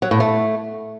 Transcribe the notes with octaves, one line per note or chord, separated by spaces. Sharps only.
F#3
A2
A3